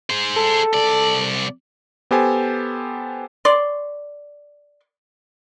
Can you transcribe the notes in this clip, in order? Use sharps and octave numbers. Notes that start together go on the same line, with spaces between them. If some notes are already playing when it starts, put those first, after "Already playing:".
G#4 C5
A4
C2 D5
B3 G4 A4 C5 G#5
C#5 D5 C6